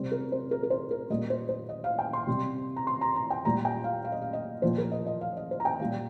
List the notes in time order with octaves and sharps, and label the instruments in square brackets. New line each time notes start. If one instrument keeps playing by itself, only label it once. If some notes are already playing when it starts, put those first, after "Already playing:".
Already playing: [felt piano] C3 G3 C5
A#4
C5
A#4
A#4
C5
A#4
A#2 G3 D#5
C5
C5
D#5
F5
G5
C6
C3 G3
A#5
C6
A#5
A#5
G5
A#2 G3 A#5
G5
F5
F5
D#5
F5
D#5
A#2 F3 C5
A#4
D#5
D#5
F5
D#5
C5
A#5
G5
A#2 G3 F5